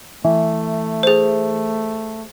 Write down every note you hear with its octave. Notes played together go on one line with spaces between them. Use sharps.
E3 A3
G#4 C5